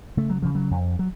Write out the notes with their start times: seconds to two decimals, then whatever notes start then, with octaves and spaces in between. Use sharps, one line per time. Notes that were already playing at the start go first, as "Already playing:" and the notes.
0.17 C#3 A3
0.30 F#3
0.42 C#3 F3
0.55 F#3
0.71 F2
0.99 F#3